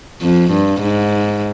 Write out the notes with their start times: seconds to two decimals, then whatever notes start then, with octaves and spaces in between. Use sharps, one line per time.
0.21 F2
0.51 G2
0.81 G#2